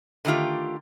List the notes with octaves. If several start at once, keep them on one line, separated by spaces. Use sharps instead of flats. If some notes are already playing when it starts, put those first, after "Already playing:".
D3 D#3 F#3 A3 F4 G4